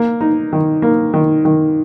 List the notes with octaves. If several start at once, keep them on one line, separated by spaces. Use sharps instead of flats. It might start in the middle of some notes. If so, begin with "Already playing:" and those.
Already playing: A#3
D#4
D#3
A#3
D#3
D#3